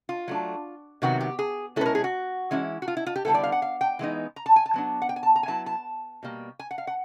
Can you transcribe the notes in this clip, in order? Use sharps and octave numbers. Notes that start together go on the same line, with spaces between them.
F4
F#3 A3 D4
C3 D#3 F#3 B3 F#4
G4
G#4
B2 G#3 C#4 E4 A4 B4
A#4
G#4
F#4
E3 G#3 C#4 E4
F#4
F4
E4
F4
G4
D3 G3 B3 E4 A4
D5
F5
F#5
F5
G5
E3 G#3 B3 D#4
A#5
A5
G#5
A5
F#3 B3 D4
F#5
G5
G#5
A5
A#5
G#5
F#3 B3 E4 A5
A5
B2 G3 A#3
G#5
F#5
F5
F#5